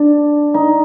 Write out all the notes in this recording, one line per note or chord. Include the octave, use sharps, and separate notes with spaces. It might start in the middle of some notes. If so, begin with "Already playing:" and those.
Already playing: D4
D#4